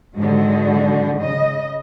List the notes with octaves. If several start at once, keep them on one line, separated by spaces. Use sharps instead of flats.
G#2 D3 D#3 F#3 G#3 F#4
C#3 D#5